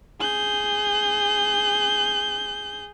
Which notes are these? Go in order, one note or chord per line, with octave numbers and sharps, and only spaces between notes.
G#4 G6